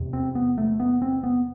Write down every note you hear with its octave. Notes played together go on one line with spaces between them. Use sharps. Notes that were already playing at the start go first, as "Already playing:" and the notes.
Already playing: E2 C3
C4
B3
A3
B3
C4
B3